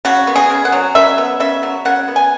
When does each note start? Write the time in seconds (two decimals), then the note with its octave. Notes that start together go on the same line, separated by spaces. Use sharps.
0.05 C#3 F#4
0.27 B3
0.36 G#4
0.50 C#3
0.65 F#5
0.72 F#3
0.95 C#3 E5
1.18 B3
1.40 C#3 E5
1.63 F#3
1.85 C#3 F#5
2.08 B3
2.16 G#5